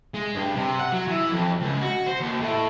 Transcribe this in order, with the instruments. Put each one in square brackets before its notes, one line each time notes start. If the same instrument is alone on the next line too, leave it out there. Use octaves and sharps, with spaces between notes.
[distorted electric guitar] G#3
G2
C3
F#5
F#3
E3
F2
C#2
F#4
C5
D#2
A2